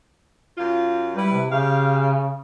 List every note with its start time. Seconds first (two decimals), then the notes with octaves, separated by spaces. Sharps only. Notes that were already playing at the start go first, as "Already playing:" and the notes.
0.58 F#2 F4
1.16 G3 E4 B4
1.32 C3
1.51 C#3 G4 F5